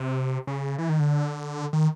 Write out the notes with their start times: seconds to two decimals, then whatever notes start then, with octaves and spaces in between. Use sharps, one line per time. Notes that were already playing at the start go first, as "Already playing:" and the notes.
Already playing: C3
0.47 C#3
0.78 E3
0.89 D#3
1.00 D3
1.73 D#3